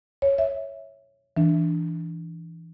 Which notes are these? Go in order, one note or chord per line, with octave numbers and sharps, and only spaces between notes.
C#5
E5
E3 D4